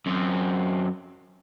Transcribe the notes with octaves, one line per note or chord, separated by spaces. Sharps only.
F#2 C4